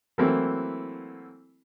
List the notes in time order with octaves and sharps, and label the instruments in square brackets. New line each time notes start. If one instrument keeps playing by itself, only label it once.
[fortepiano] E3 F#3 A3 A#3 C4 E4